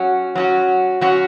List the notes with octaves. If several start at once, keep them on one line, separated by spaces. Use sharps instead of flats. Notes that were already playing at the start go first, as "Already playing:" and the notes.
Already playing: F#3 C#4 F#4
F#3 C#4 F#4
F#3 C#4 F#4